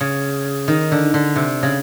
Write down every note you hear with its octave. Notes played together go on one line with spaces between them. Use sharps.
C#3
D#3
D3
D3
C3
C#3